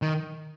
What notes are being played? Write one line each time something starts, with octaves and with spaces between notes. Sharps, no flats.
D#3